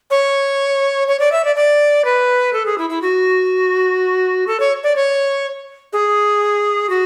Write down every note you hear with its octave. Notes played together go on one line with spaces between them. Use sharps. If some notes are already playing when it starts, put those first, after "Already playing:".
C#5
C#5
D5
E5
D5
D5
B4
A4
G#4
E4
E4
F#4
A4
C#5
D5
C#5
G#4
F#4